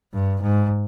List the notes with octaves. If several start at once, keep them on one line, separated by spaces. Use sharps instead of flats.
G2
G#2